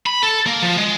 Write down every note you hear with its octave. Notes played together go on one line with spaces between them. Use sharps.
B5
A4
A#3
F3
G#3